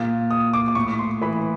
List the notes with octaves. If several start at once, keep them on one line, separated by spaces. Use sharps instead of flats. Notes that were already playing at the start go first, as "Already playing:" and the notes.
Already playing: A#2
D#6
D6
D6
A2 C#6
C6
E3 B5